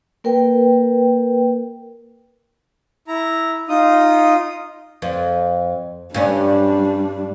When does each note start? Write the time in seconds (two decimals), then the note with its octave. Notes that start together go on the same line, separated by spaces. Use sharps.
0.24 A#3 A#4 B4 G5
3.08 E4 A#5
3.69 D#4 F4 D#6
5.02 F2
6.14 G2 G3 C#4 D4